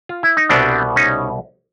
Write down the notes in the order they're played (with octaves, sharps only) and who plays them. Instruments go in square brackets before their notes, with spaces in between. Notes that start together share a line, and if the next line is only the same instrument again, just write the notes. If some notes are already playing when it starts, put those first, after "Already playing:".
[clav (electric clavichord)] F4
E4
D#4
C2 B2 G3 B3 C4 D4
C#4 D#4